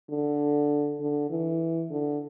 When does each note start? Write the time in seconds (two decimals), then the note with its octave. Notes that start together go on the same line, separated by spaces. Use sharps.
0.09 D3
1.00 D3
1.30 E3
1.91 D3